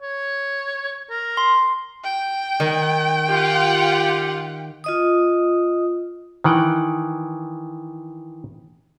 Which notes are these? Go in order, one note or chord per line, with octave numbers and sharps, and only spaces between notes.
C#5
A#4
C6
G5
D#3
F4 G4 F#5
F4 D#5 D#6
D#3 E3 F#5 G5